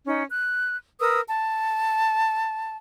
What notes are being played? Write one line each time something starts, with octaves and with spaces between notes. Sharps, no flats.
C#4 D#4
F#6
A#4 B4 D#6 E6
A5